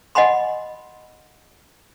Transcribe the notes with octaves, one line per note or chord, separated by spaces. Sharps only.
D#5 F#5 G#5 B5 C6